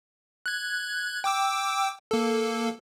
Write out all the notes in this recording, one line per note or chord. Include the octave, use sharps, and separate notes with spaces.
F#6 G#6
G5 D6 E6
A#3 A4